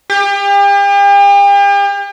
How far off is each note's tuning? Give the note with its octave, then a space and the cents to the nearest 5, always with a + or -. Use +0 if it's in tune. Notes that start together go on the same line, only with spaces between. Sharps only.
G4 +40